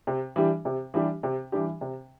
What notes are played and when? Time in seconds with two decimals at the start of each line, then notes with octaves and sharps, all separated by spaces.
0.07 C3
0.36 E3 G3 D4 G4
0.65 C3
0.94 E3 G3 D4 G4
1.23 C3
1.52 E3 G3 D4 G4
1.81 C3